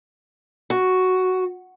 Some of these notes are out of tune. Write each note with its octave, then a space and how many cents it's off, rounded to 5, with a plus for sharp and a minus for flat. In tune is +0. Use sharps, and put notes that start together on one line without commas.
F#4 +0